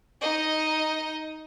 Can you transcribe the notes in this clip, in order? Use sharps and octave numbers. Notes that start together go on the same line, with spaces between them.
D#4 D#5